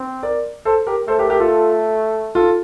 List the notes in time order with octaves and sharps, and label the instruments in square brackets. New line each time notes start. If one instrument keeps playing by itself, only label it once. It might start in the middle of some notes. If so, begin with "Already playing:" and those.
Already playing: [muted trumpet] C4
[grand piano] A#4 D5
A4 C5
G4 A#4
[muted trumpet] A3 [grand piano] A4 C5
[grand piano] G4 A#4
G4 A#4
F4 A4
F4 A4